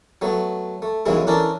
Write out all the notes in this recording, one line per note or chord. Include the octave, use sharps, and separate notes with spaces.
F#3 A3 B3
A3
B1 F#2 C#3 E3 G#3 E4
E3 C#4 D4 A4 A#4 A5